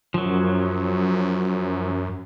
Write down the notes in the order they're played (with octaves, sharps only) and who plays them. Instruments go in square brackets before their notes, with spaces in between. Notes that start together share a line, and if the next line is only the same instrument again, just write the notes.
[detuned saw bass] F#2 [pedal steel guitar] F3 F#3